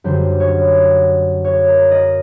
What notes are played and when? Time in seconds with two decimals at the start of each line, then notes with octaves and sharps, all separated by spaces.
0.04 F#2 D3 G3 C5
0.40 C#5
1.45 C#5
1.68 A#4
1.91 D#5